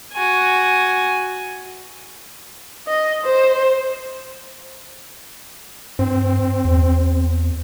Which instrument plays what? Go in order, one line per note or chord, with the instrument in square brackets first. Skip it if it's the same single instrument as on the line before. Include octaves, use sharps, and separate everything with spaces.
[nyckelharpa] F#4 G#5
[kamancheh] D#5
C5
[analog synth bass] G2 [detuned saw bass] C4
[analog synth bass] E2